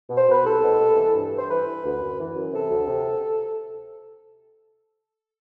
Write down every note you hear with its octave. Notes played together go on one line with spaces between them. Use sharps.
B2
C5
B2 B4
C2 A4
B2
C2
E3
G2
G2
C5
E3 B4
E3
D2
F#2
E3
F#2
C3 A4
D2
C3